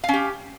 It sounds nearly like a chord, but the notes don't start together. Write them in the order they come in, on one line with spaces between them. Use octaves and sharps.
F5 C#4 G4